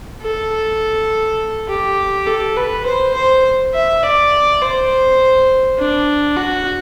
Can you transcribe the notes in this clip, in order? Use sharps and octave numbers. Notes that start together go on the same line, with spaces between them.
A4
G4
A4
B4
C5
C5
E5
D5
C5
D4
F#4